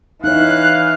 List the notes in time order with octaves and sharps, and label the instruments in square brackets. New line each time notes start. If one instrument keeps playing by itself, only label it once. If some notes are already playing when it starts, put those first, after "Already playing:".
[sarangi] E3 [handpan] D#4 C#5 [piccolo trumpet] F5 [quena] F#6